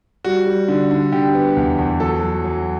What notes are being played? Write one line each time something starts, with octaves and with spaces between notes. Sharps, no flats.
G3 F#4
G3
D3
D3
D3 G4
B3
E2
E2
F#3 A4
F#3
F#3